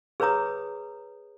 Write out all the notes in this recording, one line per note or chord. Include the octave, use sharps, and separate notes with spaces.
G#4 B4 C#5 A#5 D#6